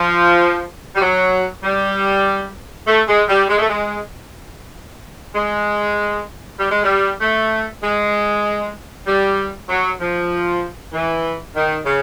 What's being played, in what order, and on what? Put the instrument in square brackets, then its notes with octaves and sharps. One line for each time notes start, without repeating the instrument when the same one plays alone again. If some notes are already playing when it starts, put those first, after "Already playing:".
Already playing: [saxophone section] F3
G3
F#3
G3
A3
G#3
G3
G#3
A3
G#3
G#3
G3
G#3
G3
A3
G#3
G3
F#3
F3
E3
D#3
C#3